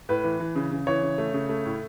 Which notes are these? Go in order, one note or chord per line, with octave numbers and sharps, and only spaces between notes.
A2 B4
E3
E3
C#3
C#3
E3 C#5
C#3
A3
C#3
A3
A2